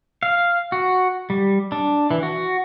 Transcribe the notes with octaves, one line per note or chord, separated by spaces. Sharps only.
F5
F#4
G3
D4
E3
F#4